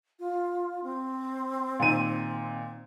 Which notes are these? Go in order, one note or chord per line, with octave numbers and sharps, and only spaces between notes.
F4
C4
A#2 D#3 D#7